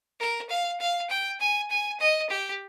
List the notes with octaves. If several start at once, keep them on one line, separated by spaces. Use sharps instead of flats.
A#4
F5
F5
G5
G#5
G#5
D#5
G4